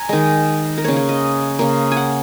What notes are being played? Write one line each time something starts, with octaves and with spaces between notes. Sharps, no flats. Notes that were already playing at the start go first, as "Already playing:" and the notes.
Already playing: G#5 A#5
D#3 G#3 D#5
A#4
C#3 A#3 C#5
C#5
D#5
C#3 A#3
F#5 G#5